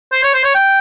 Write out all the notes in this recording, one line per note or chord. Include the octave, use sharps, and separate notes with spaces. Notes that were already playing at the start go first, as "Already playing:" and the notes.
C5
C#5
C5
C#5
G5